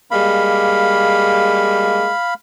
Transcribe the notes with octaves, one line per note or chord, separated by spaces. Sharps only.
G3 G#3 A#3 F5 B5